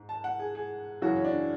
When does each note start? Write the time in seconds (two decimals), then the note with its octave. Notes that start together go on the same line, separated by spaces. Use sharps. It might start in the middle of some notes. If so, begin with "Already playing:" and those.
Already playing: G#2
0.09 A5
0.24 F#5
0.39 G#4
0.55 G#4
1.02 F#2 C#3 E3 F#4
1.16 C#4
1.24 D4